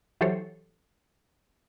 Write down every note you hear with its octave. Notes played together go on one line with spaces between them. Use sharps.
E3 F#3 G4 A4 C5 C#5